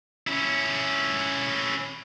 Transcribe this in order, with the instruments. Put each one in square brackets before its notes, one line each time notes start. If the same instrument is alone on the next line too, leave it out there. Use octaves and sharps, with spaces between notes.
[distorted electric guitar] C#4 E4